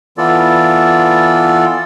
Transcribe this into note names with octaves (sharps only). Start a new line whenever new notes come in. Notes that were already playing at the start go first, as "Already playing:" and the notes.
E3 B3 F4 A4 D5